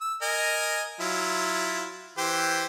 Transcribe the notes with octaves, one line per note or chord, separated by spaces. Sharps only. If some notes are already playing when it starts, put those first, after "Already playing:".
E6
A#4 D#5 G#5
F#3 E4 F4
E3 G4 C5